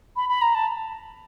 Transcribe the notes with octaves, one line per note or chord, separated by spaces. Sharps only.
B5
B5
A#5
A5